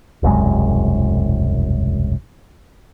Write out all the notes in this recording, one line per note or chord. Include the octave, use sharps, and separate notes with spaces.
E1 C2 F#2 G#3